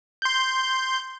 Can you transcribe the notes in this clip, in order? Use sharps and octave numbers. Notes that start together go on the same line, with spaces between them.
C6 G6